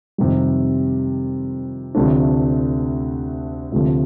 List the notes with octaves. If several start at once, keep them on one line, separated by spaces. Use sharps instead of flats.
F2 C3 D#3 G3
D2 C3 F3 A3 D4
D2 C3 F3 A3